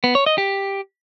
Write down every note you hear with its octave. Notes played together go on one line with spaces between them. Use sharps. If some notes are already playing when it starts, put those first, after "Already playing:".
B3
C#5
D#5
G4